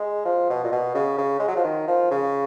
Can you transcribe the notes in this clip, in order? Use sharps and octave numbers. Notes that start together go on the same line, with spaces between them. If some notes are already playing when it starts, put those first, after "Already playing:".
Already playing: G#3
F3
B2
A#2
B2
C#3
C#3
G#3
F#3
F3
D#3
F3
C#3